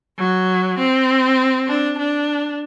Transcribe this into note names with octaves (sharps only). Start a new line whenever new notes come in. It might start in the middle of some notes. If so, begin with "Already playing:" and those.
F#3
C4
D4
D4